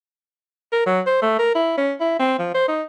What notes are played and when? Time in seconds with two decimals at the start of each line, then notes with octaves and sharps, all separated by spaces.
0.72 A#4
0.86 F#3
1.06 C5
1.22 A3
1.39 A#4
1.55 E4
1.78 C#4
2.00 E4
2.19 C4
2.39 F3
2.54 C5
2.68 D#4